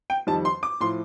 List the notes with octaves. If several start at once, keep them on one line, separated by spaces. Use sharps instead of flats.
G5
F2 D#3 G3 A5
C6
D6
A2 F3 C6